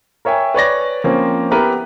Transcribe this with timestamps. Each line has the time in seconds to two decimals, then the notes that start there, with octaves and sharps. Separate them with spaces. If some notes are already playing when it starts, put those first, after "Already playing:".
0.25 A#4 C#5 E5 G5 G#5
0.54 B4 C#5 D5 A#6
1.04 F3 A#3 C4 C#4
1.51 B3 E4 G4 A#4 B4